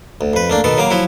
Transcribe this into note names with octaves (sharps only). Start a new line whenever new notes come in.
D2
F2 B4
A3 A#3 D4
B2 D#3 B3 A4
C#3 F#3 A#3 D6
F3 F#3 E4 F#4